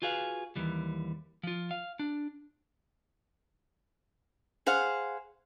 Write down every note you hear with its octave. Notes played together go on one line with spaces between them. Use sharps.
F4 F#4 G#4 B4 F5
D#2 E3 G3
F3 F4
F5
D4
G#4 C5 F5 F#5